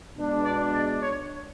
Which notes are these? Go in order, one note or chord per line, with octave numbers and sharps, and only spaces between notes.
B2 G#3 D4
D5
D5
C#5